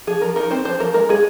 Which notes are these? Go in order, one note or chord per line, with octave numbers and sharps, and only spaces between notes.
F3 G#4
F3 A#4
D#4 A#4
C4 C5
F3 C5
F3 A#4
G#3 A#4
G#3 G#4